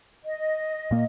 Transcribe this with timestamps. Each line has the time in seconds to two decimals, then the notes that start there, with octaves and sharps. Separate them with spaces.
0.24 D#5
0.91 A#2 A#3